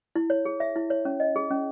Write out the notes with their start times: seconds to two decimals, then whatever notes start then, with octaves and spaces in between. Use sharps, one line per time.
0.16 E4
0.30 C#5
0.45 G#4
0.60 E5
0.76 E4
0.90 C#5
1.05 C#4
1.20 D#5
1.36 G#4
1.51 C#4